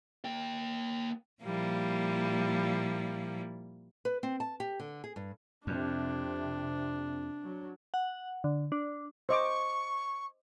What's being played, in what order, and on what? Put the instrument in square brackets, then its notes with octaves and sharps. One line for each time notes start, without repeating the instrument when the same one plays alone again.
[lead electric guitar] A#3 G5
[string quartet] A#2 F3 G3 A#3 E4
[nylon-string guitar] B4
C4
A5
G4
D3
G#4
G2
[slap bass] F2 [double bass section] C3 [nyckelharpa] D4
[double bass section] F#3
[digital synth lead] F#5
D3
D4
[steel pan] C5 D#5 D6 [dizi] C#6